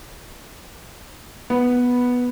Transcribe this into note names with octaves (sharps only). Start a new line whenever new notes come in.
B3